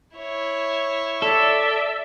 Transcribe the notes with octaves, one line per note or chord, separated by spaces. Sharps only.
E4 C#5
A4 D5 E5